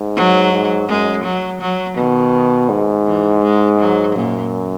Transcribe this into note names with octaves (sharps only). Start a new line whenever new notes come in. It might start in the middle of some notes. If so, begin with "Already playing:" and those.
Already playing: G#2
F#3
G#2
F#2 G#3
F#3
F#3
B2 D#3
G#2
E3
G#3
F#3
F#2 A#2